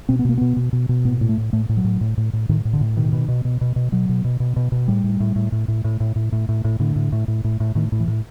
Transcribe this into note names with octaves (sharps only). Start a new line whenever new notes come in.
B2 C4
B3
B2 A#3
B2 B3
B2
B2
B2
A2 B3
A2
A3
A2
A2 A3
A2
F#3
A2
A2
A2
A2
A2 D#3
A2
D3
A2
B2 D#3
B2
B2
B2
B2
B2
B2 F#3
B2
B2
B2
B2
B2
A2 G3
A2
A2
A2
A2
A2
A2
A2
A2
A2
A2
A2
A2 D3
A2
A2
A2
A2
A2
A2 D#3
A2
E3
A2